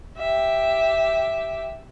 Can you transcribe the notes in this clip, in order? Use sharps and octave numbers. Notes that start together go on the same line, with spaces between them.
G4 E5